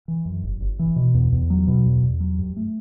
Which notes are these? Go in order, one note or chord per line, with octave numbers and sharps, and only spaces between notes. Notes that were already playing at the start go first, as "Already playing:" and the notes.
E3
F#2
G1
G1
E3
B2
E2
E2
F#3
B2
E2
E2
F#3
G2
A3